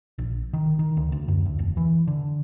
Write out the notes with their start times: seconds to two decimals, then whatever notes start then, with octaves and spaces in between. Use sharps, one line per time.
0.18 A#1
0.53 D#3
0.79 D#3
0.97 D2
1.12 D2
1.28 F#2
1.46 D2
1.59 E1
1.77 E3
2.07 D3